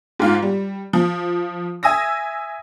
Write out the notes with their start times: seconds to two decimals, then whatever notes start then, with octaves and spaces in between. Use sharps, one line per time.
0.19 G#2 F4 F5
0.42 G3
0.93 F3
1.83 E5 G#5 D#6 E6 A#6